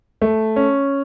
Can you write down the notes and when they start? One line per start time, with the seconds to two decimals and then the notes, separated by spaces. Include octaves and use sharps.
0.22 A3
0.56 C#4